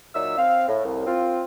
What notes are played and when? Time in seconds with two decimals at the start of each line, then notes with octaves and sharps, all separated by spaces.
0.14 A#2 F#3 D#4 D5 E5 E6
0.37 C4 F5
0.68 A2
0.84 C2
1.07 C4 F4